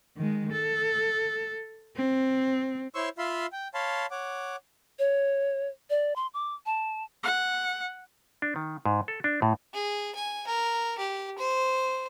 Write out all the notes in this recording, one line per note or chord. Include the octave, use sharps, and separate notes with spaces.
D#3 G#3
A4
C4
E4 C5 C#5 C6 C#6 E6
F4 E5 F5 B5 C6
G5
C#5 F5 A5 B5 C6
C#5 F#5 D6
C#5
D5
C6
D6
A5
F#5
D4
D#3
G#2
A4
D4
A2
G#4
G#5
A#4
G4
C5